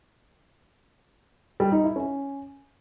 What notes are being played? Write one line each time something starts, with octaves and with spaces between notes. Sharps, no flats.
G3
D#4
E4
C#4